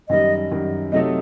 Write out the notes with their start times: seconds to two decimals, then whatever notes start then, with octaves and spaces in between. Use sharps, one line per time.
0.09 F#2 D#3 G3 D#5
0.51 F#2 D#3 G3
0.92 C3 F#3 A3 D#4 A4 D#5